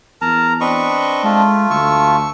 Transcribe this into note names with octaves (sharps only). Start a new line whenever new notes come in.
E2 A#4 A5 A#5
C4 D4 B4 D#5 C#6
G#3 A3 F4
D2 C#6 E6